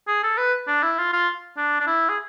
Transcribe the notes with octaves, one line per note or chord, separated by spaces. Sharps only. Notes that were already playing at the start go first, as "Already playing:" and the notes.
G#4
A4
B4
D4
E4
F4
F4
D4
D4
E4
G#4